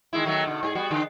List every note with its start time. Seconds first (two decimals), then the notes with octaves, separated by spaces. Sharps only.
0.13 D#3 G#3 E4
0.25 D#3 F#3 A3
0.46 B2 D3
0.63 G#2 G4 G#4
0.75 G3 B3 F#4
0.91 D3